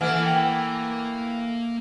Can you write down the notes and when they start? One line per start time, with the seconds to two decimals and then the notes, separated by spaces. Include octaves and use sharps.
0.01 E3 A3 A#3 F#5 F6
0.26 G5